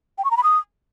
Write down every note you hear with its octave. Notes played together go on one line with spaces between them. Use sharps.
G5
C#6
A#5
B5
D#6